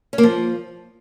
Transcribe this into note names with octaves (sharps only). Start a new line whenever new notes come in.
C#4
A#3
F3